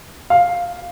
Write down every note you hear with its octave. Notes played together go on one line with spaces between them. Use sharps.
F5